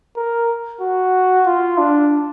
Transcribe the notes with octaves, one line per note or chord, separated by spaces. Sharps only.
A#4
F#4
F4
D4